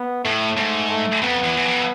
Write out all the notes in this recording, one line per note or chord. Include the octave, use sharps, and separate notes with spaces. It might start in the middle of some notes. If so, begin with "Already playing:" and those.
Already playing: B3
A2 A3
G#2 A3
A3
F2 B3
E2
E2
F2